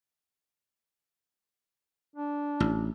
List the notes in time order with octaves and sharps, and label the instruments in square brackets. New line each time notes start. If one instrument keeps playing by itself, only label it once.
[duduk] D4
[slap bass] A1